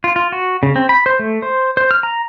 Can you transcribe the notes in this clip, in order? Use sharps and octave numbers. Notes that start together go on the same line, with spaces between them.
F4
F4
F#4
C#3
C4
B5
C5
A3
C5
C5
F6
A#5